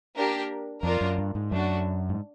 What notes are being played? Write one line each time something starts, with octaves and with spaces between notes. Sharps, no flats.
A#3 D4 G4 A#4
F2 A#3 D4 F4 A#4
F#2
G2
G#2
F#2 A3 D4 F#4
G#2